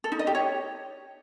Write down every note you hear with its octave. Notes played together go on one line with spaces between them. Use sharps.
A4
D#4
D#5
G4
C#5